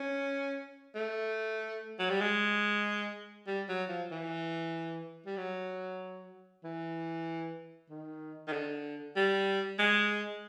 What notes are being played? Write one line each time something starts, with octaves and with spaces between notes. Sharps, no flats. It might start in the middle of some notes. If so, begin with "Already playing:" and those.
Already playing: C#4
A3
F#3
G3
G#3
G3
F#3
F3
E3
G3
F#3
E3
D#3
D#3
D3
G3
G#3